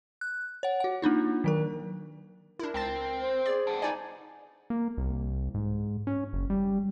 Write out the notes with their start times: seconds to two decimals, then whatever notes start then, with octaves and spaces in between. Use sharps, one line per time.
0.21 F#6
0.63 C#5 F#5
0.80 F#4 F#5
1.02 A#3 D4 D#4 F4
1.44 D#3 F#3 A#4
2.59 D4 E4 A#4
2.74 C#2 C4 A5 A6
3.19 C5
3.46 G#4 D5
3.67 B3 D4
3.82 D#4 D5 G#5
4.70 A#3
4.98 C2
5.54 G#2
6.07 C#4
6.33 F#1
6.50 G3